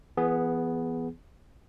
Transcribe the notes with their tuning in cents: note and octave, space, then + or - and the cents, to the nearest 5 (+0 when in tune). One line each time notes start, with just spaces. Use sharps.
E3 +35 B3 +0 G#4 +0